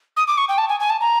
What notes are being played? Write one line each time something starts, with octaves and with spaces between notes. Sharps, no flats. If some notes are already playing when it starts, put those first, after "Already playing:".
D#6
D6
C#6
G5
A5
G#5
G#5
A5
A#5